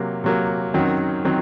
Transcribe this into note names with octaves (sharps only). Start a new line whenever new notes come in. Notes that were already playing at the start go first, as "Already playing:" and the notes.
Already playing: C3 F#3 A#3
C3 F#3 A#3
F#2 D#3 F#3 C4
D#3 F#3 C4